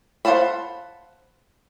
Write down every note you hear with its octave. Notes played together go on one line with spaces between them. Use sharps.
C5 F5 F#5 A5 B5